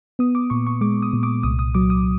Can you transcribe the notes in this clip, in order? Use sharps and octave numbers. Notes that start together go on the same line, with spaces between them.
B3 D#6
D6
A#2 C#6
C#6
G#3 D6
D#6
A#2
D6
C2 D#6
D#6
F#3 D6
D#6